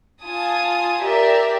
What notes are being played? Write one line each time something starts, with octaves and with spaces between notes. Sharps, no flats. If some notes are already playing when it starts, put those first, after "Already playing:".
F4 G#5 A5 D#6
G4 A#4 D5 E5